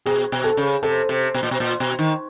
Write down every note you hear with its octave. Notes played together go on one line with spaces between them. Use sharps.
B2 G#4
B2
A4
C#3
C3 A4
C3
B2
A#2
B2
A#2
B2
D#3